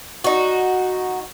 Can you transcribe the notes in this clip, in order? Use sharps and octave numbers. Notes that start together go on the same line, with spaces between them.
D#4 F#4